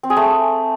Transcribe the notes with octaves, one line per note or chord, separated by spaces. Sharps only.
C4
G#4
A3